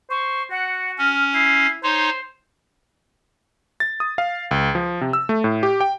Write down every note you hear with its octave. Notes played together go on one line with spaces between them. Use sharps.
C5 C#6
F#4 F#5
C#4 F6
E4 C7
D#4 C5 C#5 C6
A6
D#6
F5
C#2
F3
C3
E6
A3
A2
G4
G5